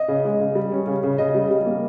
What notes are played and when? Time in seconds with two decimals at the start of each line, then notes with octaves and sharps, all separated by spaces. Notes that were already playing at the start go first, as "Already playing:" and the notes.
Already playing: D#5
0.08 C#3
0.25 G#3
0.40 C#3
0.55 G3
0.72 C#4
0.87 C#3
1.03 C#3
1.18 C#3 D#5
1.35 G3
1.51 G3
1.66 A#3